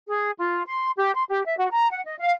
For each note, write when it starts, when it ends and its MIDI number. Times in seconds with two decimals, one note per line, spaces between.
0.08 0.31 68
0.39 0.62 65
0.67 0.89 84
0.96 1.13 67
1.15 1.23 84
1.29 1.43 67
1.45 1.58 76
1.59 1.68 66
1.72 1.87 82
1.92 2.02 78
2.06 2.15 75
2.19 2.33 77